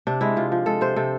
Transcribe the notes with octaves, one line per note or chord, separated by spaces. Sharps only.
C3 D4
G#3 E4
C3 F4
F3
G#3 A4
C3 C5
C3 A4